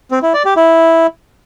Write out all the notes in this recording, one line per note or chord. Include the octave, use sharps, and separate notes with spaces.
C4
E4
D5
G4
E4